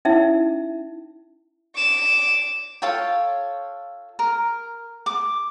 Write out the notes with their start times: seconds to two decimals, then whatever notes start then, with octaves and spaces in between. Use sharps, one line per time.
0.05 C#4 D#4 E4 E5
1.76 D6 E7
2.82 F4 A4 C#5 G5
4.19 A#4
5.06 D6